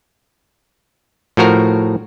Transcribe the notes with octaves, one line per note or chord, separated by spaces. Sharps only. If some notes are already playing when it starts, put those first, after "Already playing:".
A2 F3 F#4 A#4